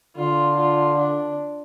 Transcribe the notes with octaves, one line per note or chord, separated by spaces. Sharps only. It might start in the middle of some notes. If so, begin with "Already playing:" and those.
D3 F4
F4
D4